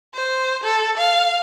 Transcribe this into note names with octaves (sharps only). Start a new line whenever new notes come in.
C5
A4
F5